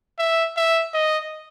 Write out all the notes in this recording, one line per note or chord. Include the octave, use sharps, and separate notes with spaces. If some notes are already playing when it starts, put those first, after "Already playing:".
E5
E5
D#5